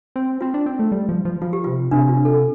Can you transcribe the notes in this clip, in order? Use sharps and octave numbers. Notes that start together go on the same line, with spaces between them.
C4
C4 F4
D4
C4
A3
G3
F3
F3
F3 F4
G4
C3 F4
C3 D4
F4
A4